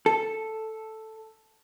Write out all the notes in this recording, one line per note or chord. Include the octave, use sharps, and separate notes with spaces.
A4